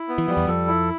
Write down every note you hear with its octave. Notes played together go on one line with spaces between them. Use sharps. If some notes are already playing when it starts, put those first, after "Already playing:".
Already playing: E4
B3
E3
F3 G3
E2 E3
F2 F3 A4
E4